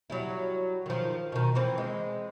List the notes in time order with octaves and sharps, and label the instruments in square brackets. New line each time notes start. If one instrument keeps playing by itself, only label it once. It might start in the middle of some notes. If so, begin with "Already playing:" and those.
[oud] F#3 G3 E4
D#3 F3
B2 D#3
E3 F3 C4
G#3